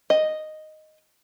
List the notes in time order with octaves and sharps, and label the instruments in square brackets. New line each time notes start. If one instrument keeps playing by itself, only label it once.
[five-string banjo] D#5